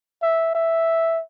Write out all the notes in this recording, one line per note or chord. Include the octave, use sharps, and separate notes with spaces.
E5
E5